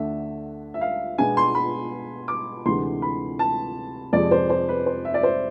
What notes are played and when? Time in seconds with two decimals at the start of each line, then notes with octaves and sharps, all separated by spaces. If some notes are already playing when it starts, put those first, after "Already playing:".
Already playing: D2 D3 A3 D4 E5
0.74 E5
0.81 F5
1.18 B2 G#3 B3 D4 G#5
1.37 C6
1.55 B5
2.28 D6
2.66 D2 C3 E3 G#3 C6
3.02 B5
3.39 A5
4.13 F2 C3 F3 G#3 D5
4.31 C5
4.50 C5
4.69 B4
4.86 C5
5.05 E5
5.14 D5
5.23 C5